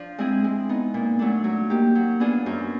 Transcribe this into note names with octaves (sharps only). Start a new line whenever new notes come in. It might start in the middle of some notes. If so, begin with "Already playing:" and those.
Already playing: F3 D4
G#3 C4 E4 G#4
G#3
B3 D#4
A#2
F#3 A3 D4
F#3
A#3 D#4 G4
F#3
B3 D4 F4 G#4
F#2